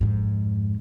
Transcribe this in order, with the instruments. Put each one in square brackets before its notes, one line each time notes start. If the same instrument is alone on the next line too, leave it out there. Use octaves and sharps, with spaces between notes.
[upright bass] F2 G#2